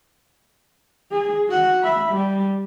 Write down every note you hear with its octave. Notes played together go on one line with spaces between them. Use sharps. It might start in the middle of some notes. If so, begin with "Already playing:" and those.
G#4
F#4 F#5
E5 B5
G3